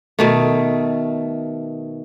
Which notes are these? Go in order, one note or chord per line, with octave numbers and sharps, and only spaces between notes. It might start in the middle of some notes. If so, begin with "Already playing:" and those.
B2 D#3 A3